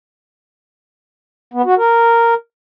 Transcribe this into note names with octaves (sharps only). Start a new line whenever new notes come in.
B3
F#4
A#4